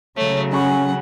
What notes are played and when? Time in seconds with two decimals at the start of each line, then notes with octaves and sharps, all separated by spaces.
0.17 C#3 F#3 A3 C#5
0.52 C#4 G#4 F#5 B5 C#6